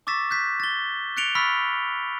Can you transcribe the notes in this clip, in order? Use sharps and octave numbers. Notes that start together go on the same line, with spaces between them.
C#6 D6 E6 A6 B6 E7
F#6 G6 B6
A6 G7
F#6 A6 C#7 D7 F7 G7
B5 C#6 E6 F6 A6 B6